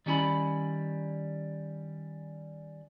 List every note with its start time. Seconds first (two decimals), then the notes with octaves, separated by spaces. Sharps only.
0.06 D#3 G3 C#4 E4 B5